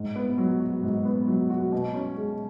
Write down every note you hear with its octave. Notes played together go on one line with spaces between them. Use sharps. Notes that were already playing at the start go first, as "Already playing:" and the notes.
Already playing: G#2
B3
F#3
F#4
G#2
B3
F#3
F#4
B2
C#4
G#3